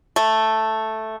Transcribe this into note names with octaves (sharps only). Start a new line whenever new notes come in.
A3